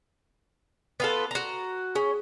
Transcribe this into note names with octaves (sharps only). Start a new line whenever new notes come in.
B3 F4 A4
F#4 A#5
C#4 G#4